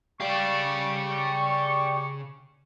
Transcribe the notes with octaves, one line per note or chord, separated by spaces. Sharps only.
C#3 G4 D5 F5 C#6